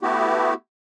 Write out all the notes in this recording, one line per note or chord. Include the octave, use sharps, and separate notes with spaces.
A3 B3 E4 F#4 G4